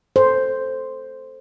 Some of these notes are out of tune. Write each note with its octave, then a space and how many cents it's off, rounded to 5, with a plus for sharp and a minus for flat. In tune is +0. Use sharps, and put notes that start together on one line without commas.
A4 +0 C5 +0